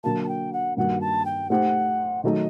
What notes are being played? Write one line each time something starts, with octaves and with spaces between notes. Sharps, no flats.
D3 F#3 A#3 A5
A5
G5
F#5
G2 D#3 G3 A#3 F#4 F#5
A5
G5
A3 D#4 G4 C5 F#5
D#3 F#3 A3 D#4 A4 D#5